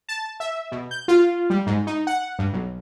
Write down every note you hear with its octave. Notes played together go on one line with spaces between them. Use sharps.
A5
E5
B2
G6
F4
G3
G#2
D#4
F#5
G2
B1